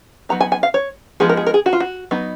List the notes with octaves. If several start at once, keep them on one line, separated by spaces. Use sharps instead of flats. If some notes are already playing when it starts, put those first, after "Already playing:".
F#3 B3 D#4 A#5
G#5
G#5
F5
C#5
F3 G#3 B3 D#4 G#4
A#4
G#4
A#4
G#4
F#4
F4
F#4
F#3 B3 D#4